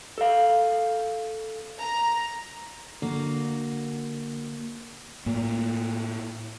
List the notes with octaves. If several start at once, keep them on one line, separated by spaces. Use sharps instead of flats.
A4 F5
A#5
D3 A#3 F#4
A2 A#3